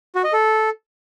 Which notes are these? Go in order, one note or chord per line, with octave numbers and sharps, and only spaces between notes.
F#4
D#5
A4